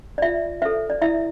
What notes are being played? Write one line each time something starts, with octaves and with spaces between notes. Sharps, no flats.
D5
F4 E5
A4 C5 E5
D5
E4 E5